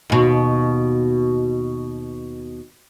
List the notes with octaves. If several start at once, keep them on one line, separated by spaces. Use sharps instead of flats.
D#2 B2